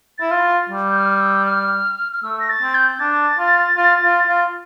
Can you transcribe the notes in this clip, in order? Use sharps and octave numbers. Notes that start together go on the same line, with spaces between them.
E4 A6
F4
A6
G3
G6
F6
E6
F6
F6
A3 E6
A#6
A6
C4
G6
D4 A6
F4
F4
F4
F4